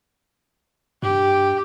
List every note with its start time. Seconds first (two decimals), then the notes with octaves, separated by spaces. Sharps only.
1.03 G2 G4